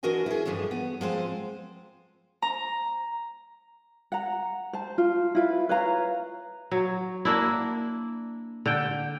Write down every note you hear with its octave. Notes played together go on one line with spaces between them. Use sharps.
E3 D4 F#4 A#4 D#5 G#5
E4 G#4
G2 E3 F3 G#3 A3
B3
F3 G#3 C4 C5
A#5
F#5 A#5
C5 A5
F4
E4 F4 B4
B4 C#5 F5 A#5
F#3
A#3 D4 E4
D3 G5